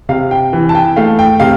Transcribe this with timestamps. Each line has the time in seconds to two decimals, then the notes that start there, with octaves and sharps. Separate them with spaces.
0.09 C3 F5
0.31 G5
0.53 E3
0.69 A5
0.75 G5
0.96 A3 F5
1.19 G5
1.40 C3 F5